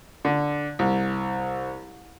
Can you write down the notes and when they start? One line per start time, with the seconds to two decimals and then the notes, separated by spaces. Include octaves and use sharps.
0.25 D3
0.79 C2